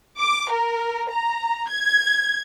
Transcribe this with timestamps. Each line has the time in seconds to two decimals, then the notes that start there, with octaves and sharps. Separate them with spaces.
0.19 D6
0.51 A#4
1.10 A#5
1.70 G#6